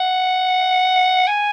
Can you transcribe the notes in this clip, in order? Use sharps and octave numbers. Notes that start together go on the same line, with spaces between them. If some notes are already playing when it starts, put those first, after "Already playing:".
Already playing: F#5
G#5